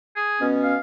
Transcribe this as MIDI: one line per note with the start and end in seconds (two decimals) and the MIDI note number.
0.16 0.49 68
0.41 0.76 47
0.41 0.76 59
0.41 0.76 61
0.63 0.79 77